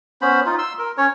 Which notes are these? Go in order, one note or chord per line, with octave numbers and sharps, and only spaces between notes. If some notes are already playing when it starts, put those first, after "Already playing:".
B3 C#4 C5 B5
D#4 F4
C6 E6
A#4
C#4 C#5